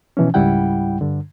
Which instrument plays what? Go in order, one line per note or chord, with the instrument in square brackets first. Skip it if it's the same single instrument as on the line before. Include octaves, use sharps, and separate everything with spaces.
[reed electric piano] B2 E3 F3 C#4
C#2 G#2 G3 E4 F#5 G5
G2 D3